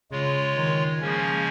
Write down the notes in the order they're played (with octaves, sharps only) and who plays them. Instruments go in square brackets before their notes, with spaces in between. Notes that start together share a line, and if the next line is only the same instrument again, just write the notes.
[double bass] C#3 [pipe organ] G#3 F4 C#5
[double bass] D#3
[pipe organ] C#3 F3 A#3 C#4 [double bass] G#3